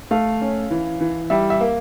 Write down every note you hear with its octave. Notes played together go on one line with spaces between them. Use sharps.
A3 F5
C#4
E3
E3
G3 E5
E5
A#3